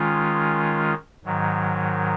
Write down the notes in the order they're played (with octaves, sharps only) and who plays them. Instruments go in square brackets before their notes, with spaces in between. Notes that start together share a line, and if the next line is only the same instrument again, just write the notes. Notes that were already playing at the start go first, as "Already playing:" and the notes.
Already playing: [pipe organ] D#3 G#3 C#4 F4
G#2 D#3 F#3